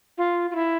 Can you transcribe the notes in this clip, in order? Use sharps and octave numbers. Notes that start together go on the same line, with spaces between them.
F4
F4
E4